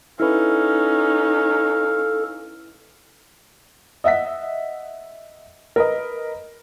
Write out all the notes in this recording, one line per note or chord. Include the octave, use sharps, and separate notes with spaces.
C#4 D#4 E4 A4 B4 F5
D#5 E5 F#5 B6
A#4 B4 D#5